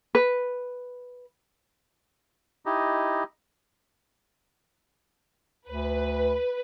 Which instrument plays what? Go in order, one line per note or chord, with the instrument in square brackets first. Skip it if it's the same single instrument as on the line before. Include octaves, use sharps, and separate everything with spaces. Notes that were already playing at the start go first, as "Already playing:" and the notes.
[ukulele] B4
[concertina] D#4 E4 G4 D#5
[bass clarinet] D2 [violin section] B4